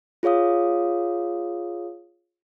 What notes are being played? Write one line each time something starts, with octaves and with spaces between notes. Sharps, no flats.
F4 G#4 C#5 F5 D#6